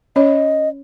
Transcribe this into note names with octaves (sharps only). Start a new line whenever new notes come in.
C#4 C#5 D#5